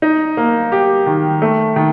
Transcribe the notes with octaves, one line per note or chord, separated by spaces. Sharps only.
D#4
A#3
G4
D#3
A3
D#3